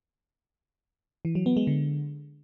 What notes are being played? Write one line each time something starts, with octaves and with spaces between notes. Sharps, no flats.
E3
F#3
B3
G#3
D3